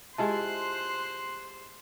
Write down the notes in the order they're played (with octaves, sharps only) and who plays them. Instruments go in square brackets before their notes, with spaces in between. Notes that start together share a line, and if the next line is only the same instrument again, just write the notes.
[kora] G#3 E4 F4 [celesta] G4 A5 [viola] C5 C6 [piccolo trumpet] F#6